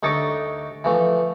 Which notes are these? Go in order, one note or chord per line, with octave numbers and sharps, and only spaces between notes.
D2 D#4 A4 C#5 D#5 D6
E3 F3 A3